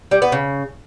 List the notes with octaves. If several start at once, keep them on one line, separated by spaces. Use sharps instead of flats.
G3
B3
C#3